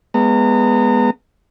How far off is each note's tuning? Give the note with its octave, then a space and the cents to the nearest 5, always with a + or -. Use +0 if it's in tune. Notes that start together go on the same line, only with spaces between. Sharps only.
G#3 +0 B3 +0 A#5 -35